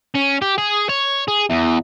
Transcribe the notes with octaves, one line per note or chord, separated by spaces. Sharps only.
C#4
G4
G#4
C#5
G#4
E2